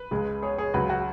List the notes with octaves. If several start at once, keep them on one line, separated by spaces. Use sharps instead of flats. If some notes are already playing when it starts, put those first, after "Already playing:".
Already playing: B4
C#2 C#3 G#3
G#4 C#5
G#4 C#5
C#2 C#3 F#3 F#4 B4
F#4